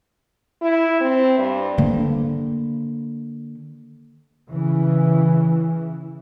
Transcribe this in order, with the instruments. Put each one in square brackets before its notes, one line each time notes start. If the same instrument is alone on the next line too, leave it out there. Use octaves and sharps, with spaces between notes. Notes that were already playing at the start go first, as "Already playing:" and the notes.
[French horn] E4
C4
G2
[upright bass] D3 A#3
[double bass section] C#3 E3